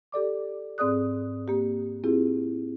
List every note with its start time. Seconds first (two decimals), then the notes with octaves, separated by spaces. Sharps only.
0.12 G4 A4 D5 D6
0.78 G#2 C4 G#4 D5 D#6 F#6
1.48 A#3 G4
2.04 C4 E4 F4 G4 G#4